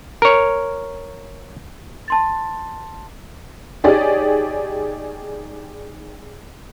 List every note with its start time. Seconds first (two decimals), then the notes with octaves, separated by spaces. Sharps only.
0.22 A#4 C#5
2.08 A5 C6 A6
3.84 D#4 G4 G#4 C#5 D5